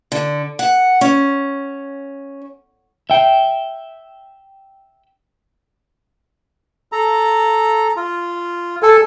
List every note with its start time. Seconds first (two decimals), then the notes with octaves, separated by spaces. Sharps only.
0.12 D3
0.59 F#5
1.01 C#4
3.10 E5 G5
6.92 A4 A#5
7.96 F4
8.83 A4 G#5